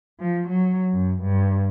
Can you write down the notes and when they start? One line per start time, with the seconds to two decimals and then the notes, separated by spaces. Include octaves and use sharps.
0.20 F3
0.48 F#3
0.94 F#2
1.23 G2